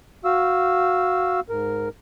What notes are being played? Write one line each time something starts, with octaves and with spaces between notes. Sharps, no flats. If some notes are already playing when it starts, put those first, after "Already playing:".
F#4 F5 E6
G#2 A#4